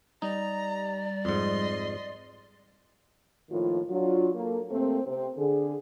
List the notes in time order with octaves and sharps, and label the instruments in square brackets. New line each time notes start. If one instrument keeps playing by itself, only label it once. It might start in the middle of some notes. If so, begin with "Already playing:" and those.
[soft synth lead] G3 [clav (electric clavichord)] D#4 [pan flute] D5 [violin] A#5
[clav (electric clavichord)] F2 G#2 [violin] D#5 C6
[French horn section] A2 D#3 F3 A#3 F4
F#3 D4 F4
A#3 A4
C3 A3 A#3 C4
C3 C4
D3 G#4